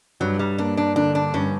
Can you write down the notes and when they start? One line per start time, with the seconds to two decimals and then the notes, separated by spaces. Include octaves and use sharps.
0.20 G2 F#3
0.39 G3
0.58 A#3 D4
0.77 D4
0.96 D3 D4
1.15 D4
1.34 G2 C#4